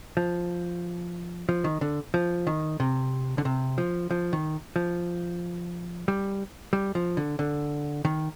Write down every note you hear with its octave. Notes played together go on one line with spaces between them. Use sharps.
F3
F3
D#3
D3
F3
D#3
C3
D3
C3
F3
F3
D#3
F3
G3
G3
F3
D3
D3
D#3